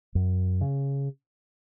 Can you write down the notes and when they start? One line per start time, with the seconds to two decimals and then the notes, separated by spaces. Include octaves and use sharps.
0.15 F#2
0.61 C#3